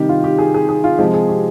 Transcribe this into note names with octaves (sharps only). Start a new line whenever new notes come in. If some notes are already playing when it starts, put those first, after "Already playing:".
Already playing: C3 D#3 G3 G4
F4
G4
G#4
G#4
G#4
F4
C3 F3 G#3 G4
G#4
G4